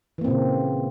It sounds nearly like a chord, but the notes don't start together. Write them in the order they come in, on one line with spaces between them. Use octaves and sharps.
E3 A#3 C4 A#2 C#3